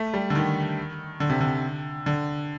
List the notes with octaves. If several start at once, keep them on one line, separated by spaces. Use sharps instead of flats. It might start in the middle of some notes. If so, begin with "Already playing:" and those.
Already playing: A3
G3
D3
D#3
D3
C3
D3
D3